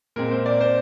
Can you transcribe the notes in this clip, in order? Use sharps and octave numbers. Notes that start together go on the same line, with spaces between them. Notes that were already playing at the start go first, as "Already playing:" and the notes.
A#2 G#3 C4 A#4
C5
D5
C5